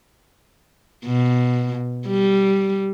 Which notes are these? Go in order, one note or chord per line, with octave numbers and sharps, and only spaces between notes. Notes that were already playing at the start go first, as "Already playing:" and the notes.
B2
G3